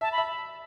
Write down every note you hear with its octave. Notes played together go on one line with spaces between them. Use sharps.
E5 A5
B5
E5